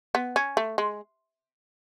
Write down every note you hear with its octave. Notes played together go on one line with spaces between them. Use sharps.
B3
C#4
A3
G#3